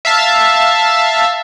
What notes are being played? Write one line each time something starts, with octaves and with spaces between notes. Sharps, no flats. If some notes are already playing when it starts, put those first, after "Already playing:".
E5 F5 A5